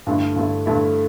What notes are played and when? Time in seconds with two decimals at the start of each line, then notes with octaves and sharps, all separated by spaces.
0.07 G2 D3 A3 E4
0.36 G2 D3 A3 E4
0.66 G2 D3 A3 E4